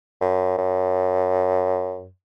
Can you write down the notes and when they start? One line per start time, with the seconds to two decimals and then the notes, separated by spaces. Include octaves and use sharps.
0.21 F#2
0.58 F#2